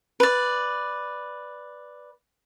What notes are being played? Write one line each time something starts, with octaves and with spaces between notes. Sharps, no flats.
B4 D5